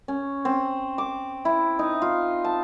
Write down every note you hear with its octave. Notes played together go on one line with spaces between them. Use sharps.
C#4
C4
D6
E4
D#4
F4
A5